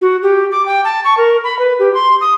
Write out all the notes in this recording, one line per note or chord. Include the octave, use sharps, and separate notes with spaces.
F#4
G4
D6
G5
A5
C#6
A#4
B5
B4
G4
C6
D#6